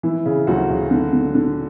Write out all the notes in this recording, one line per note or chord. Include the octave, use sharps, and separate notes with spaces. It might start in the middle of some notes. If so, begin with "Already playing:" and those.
E3 E4
C#3
D2 F#3 F#4
C#3
D3
D3
D3